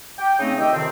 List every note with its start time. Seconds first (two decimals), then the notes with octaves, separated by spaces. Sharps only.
0.19 G5
0.39 C#3 A3 C4 D#4
0.58 D#3 G4 D#5 E5 G5
0.72 F2 C3 D#3 C4